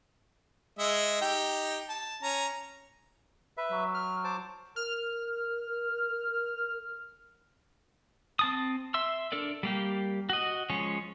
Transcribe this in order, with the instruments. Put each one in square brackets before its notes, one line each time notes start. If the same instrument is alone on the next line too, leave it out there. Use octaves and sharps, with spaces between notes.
[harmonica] G#3 D#5 E5
D#4 G4 G5
A5
C#4 A#5
[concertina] B4 E5
[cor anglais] F#3
[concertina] F6
C5 A5 D6
[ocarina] A#4 [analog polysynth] F6
[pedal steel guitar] C4 A5 D#6
E5 C6 E6
D4 A4 A#4 D5
G3 A#3 G4
F#4 D#5
F3 G#3 C#4 C#5